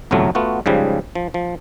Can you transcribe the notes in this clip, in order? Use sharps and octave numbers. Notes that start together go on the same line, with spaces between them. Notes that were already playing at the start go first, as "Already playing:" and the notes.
G1 C2 F2 F#3 A3
A3 B3 F4 F#4
G#2 C#3 F3 G3
F3
F3